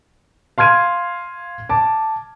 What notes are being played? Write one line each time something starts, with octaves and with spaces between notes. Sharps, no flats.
F5 C6 F6 G#6 D#7
A5 D6